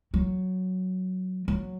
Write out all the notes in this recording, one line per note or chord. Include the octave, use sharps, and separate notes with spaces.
F#3
F#3